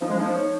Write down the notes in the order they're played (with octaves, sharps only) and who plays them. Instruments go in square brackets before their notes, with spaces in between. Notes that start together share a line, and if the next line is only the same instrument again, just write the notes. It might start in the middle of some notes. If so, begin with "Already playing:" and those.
[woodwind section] F3 [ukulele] D#4
[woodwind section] G#3
[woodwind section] F3 [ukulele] D#4
[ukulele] C#5